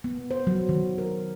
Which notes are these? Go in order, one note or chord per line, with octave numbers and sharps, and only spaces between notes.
B3
C5
F#3
D#3
A#4